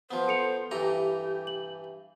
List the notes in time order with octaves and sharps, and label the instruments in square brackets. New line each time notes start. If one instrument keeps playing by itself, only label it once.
[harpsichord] F3 B3 [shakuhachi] C5
[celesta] A4 C#7 F7
[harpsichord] G2 E3 A#5 [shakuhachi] G4
[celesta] F#7